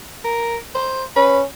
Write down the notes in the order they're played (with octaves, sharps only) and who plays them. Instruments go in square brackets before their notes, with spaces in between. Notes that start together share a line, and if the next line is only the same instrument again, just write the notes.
[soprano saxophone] A#4
C5
[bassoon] C#4 [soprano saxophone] B4